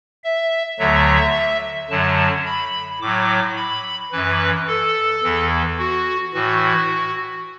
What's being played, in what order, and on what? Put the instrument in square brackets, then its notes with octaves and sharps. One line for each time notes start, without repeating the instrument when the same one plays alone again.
[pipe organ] E5
D2 D3 F#3 E5
F#2 D3 F#3 A5
B5
A2 F#3 D6
B5
F#2 E3 B4
A4
E2 E3
F#4
A2 E3 F#4